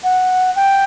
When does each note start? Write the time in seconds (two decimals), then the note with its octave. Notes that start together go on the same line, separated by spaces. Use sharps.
0.04 F#5
0.56 G5